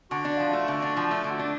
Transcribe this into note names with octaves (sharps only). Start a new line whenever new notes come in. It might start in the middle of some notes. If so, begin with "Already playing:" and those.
D3 F#4
D4
F3
A3
D3
D4
F3
A3
D3
D4